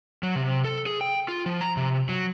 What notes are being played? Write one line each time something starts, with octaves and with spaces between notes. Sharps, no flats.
F#3
C3
A4
G#4
G5
F4
F3
A#5
C3
F#3